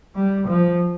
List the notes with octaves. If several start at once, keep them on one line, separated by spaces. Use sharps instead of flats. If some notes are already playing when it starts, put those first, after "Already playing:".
G3
F3